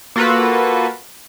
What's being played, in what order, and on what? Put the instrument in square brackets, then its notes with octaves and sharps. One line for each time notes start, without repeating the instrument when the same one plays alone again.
[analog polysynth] A#3 F4 F#4 A4 B4